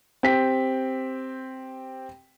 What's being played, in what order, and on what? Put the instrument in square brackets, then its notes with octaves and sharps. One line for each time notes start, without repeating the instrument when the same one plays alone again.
[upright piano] C4 G4 G5 B6